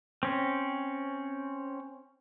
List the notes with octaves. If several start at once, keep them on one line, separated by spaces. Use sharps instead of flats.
C4 C#4